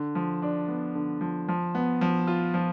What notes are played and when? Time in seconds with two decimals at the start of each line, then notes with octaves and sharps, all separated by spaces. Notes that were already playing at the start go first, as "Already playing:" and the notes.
Already playing: D3
0.15 F3
0.42 D4
0.68 B3
0.95 D3
1.21 F3
1.48 F3
1.75 B3
2.01 F3
2.27 F4
2.54 F3